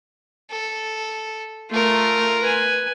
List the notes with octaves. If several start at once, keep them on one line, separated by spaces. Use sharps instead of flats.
A4
A3 F4 A#4
B4 G#5